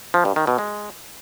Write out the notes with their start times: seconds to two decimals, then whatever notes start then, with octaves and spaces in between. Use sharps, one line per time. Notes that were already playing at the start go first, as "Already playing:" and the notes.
0.14 F3
0.25 G2
0.36 D#3
0.47 B2
0.58 G#3